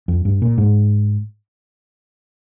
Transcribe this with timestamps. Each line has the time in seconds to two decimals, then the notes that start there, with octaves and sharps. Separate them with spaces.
0.08 F2
0.25 G2
0.42 A#2
0.58 G#2